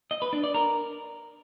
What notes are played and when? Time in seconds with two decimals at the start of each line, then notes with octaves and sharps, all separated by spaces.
0.11 D#5
0.22 B4
0.33 D4
0.44 D5
0.54 A#4